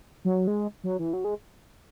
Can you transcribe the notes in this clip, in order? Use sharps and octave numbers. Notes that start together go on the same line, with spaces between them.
F#3
G#3
F#3
E3
F#3
G#3